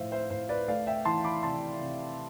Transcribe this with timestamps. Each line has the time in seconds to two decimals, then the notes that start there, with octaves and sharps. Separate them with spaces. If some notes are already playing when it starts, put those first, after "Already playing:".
Already playing: A2 F3 A3 C5 E5 F5
0.12 C5 E5
0.30 A2 C5
0.49 B4 D5
0.68 A3 D5 F5
0.87 E5 G5
1.05 E3 A5 C6
1.24 B5 D6
1.43 C3 A5 C6
1.81 C3